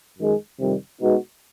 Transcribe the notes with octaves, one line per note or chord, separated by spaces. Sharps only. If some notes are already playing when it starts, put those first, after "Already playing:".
F#2 D#3 G#3
F2 C3 D#3 G3
B2 G#3 B3 D#4 F#4